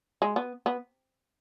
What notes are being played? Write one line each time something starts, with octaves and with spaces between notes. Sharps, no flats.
G#3
B3
B3